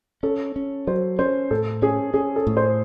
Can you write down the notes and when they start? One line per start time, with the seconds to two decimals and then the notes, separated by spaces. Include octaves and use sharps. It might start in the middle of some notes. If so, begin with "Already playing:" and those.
0.23 C#4 A4
0.56 C#4
0.87 F#3 C5
1.19 C#4 C5
1.51 A2 A4
1.82 C#4 G#4
2.14 C#4 G#4
2.36 A4
2.47 A2
2.57 C5